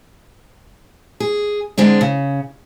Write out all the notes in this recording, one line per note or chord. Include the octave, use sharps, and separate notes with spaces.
G#4
D3 G#3 C4 D4
C#3